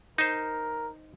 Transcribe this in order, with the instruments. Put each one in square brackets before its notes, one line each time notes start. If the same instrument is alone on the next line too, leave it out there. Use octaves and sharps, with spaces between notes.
[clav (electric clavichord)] D#4 C5 [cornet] A#4